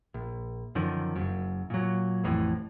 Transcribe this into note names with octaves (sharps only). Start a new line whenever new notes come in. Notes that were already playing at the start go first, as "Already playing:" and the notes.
A#1
F#2 D3 D#3 F3
F#1 F#2
A#2 F#3
A1 F2 A2 E3